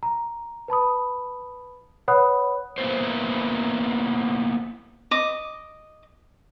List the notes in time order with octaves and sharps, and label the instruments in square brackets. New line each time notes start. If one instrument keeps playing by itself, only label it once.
[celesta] A#5
B4 A5 B5 D#6
B4 C#5 F#5 B5 D#6 F#6
[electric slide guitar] A#3 B3 E4 C5
[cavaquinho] D#5 D6